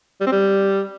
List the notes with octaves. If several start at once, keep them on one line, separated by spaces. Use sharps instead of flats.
G3
C4
G3